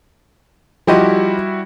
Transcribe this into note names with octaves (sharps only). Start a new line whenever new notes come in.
F3 G3 E4 F#4 G4 D#5